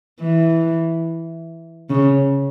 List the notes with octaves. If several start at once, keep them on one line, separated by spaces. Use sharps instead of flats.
E3
C#3